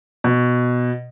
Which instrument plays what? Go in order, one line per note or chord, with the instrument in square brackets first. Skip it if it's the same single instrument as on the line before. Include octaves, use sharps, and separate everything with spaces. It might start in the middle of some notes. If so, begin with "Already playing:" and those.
[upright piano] B2